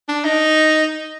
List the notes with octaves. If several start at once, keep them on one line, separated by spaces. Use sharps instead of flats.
D4
D#4